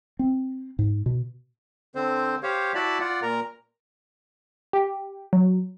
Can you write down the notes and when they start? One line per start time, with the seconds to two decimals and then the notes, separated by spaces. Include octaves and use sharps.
0.19 C4
0.79 G#2
1.06 B2
1.95 D3 C4 C5
2.43 G4 C5 C#5 F5
2.75 E4 F#4 D5 A5 B5
3.00 F4 D5 F#5
3.23 A#2 A#4 A#5
4.73 G4
5.33 F#3